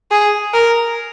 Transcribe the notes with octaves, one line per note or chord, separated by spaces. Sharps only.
G#4
A#4